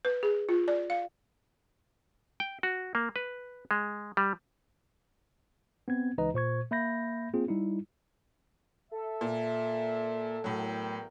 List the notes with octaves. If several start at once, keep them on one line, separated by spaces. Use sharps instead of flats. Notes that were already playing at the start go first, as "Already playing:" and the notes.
B4
G#4
F4
D5
F5
G5
F#4
A#3
B4
G#3
G3
B3 C4 G#6
C#2 E3 D#4 B4 D#5 A#5
A#2 C5 C#6 G#6
A#3 E5 B5 G6 A#6
A#3 C4 F4 G#4
G3 D#4 E4
A4 E5
A#2
E2 A2 F#3 A#4 G5